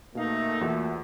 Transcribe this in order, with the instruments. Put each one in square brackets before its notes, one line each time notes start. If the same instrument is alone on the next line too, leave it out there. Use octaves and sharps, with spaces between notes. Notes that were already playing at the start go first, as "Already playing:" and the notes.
[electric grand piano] B2 F5 [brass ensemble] A3 A#3 [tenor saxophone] D#4
[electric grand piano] E2 F4 F#4